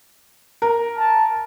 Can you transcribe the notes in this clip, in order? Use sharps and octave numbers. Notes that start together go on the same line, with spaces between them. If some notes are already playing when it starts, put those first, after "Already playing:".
A#4
A5